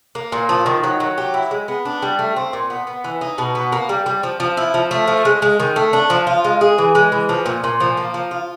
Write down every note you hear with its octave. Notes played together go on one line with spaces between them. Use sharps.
A#3
A#2
F3
D#3
F#3
F#3
G4
E4
G#3
B3
D4
G3
A3
C4
A#2
B3
B3
E3
D#4
B2
B3
A#3
G3
G3
F3
F3
E4
F3
A3
F3
G#3
G#3
D#3
A3
D4
F3
F4
G#3
G#4
E3
G#3
E3
F3
A#2
A#2
F3
A#3
F3
F4